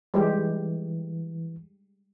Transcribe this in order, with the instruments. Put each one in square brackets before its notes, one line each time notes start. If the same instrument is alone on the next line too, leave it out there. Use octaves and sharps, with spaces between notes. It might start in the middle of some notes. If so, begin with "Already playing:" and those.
[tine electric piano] E3 [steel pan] G3 G#3 G4